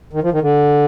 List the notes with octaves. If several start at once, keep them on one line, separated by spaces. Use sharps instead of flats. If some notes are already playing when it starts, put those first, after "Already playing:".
D#3
F3
D#3
D3